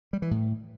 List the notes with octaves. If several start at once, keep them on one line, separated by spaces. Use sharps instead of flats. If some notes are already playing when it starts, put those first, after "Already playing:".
G3
E3
A2